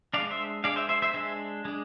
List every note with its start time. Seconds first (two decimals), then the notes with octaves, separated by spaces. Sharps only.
0.14 G#3 D4 D5 F5
0.31 C5 E5
0.64 G#3 D4 D5 F5
0.76 C5 E5
0.89 C5 E5
1.02 C5 E5
1.14 G#3 D4 C5 E5
1.65 G#3 D4